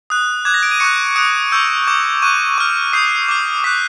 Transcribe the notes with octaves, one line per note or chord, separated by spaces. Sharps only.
D#6 F#6
D6 F#6 G#6
A#6
D7
D#7
C#6 F#6 C#7
D#6 F#6 D7
C#6 E6 G6
D6 G6
C#6 F#6 D#7
C#6 F6
D#6 G6 C7
D6 F6
D6 F#6 B6